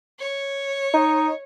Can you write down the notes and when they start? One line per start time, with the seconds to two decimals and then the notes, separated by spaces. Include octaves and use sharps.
0.19 C#5
0.94 D#4